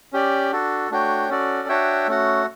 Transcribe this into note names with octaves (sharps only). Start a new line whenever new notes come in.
C#4 G4 D5
D4 F#4 A4
A3 D4 F#4 C#5 G5
C#4 F#4 A4 D5
D4 F#4 C#5 E5 G5
A3 C#4 F#4